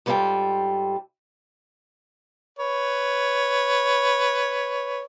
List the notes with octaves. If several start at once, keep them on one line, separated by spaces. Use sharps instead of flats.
G#2 G3 B3 F4 A4 G5
B4 C#5